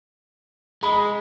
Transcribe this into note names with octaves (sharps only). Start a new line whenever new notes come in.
G#3 B5 D#6